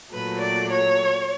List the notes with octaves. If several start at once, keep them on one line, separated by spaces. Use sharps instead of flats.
A#2 F#3 A3 B4
D5
C#5